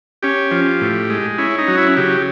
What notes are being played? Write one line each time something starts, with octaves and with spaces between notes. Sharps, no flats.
C#4 G4
F3
A2
G#3
C#4 E4
D#4
F#3
E4
C#3 G4